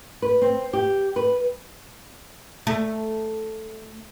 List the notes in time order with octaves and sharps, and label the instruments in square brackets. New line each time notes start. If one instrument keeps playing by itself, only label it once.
[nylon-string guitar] B4
C4
G4
B4
[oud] A3